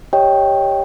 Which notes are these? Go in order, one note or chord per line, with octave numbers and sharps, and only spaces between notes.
G4 C#5 D#5 G5